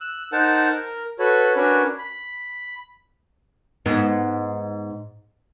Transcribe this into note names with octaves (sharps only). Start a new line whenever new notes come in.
E6 F#6
D#4 A#4 C5 F#5 A5
A#4
F#4 A4 B4 C#5
C#4 D4 F#4 A#4 B4 C#5
B5
G#2 B3